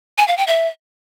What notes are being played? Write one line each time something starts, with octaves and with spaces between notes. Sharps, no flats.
G#5
F5
G5
E5